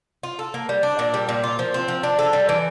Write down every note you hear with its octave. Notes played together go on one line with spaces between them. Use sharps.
F4
A4
A#3
G3
D4
A#2
G3
A#2
F4
F3
C4
F3
D4
A4
G3
E3